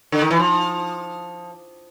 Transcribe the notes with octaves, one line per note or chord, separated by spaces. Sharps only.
D3
D#3
E3
F3